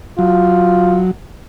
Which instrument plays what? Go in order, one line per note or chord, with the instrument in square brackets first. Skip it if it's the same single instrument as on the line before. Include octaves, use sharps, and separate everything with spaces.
[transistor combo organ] F#3 [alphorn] F4